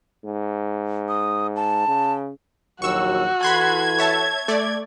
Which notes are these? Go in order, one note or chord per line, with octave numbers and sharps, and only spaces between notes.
G#2
D#6
A5
C#3
A#1 D#2 F#3 F#4 C#6 E6
E3 E4 A4 B5 C6 F#6 G#6
C#5 E5 A5
A3 D5